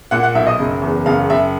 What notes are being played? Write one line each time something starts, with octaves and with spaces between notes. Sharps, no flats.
A#2 F#5
F#5
B1 E5
D#5
F#1
E2
F#1 F5
F#1 E5